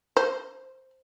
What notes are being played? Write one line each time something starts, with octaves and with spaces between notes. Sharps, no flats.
C5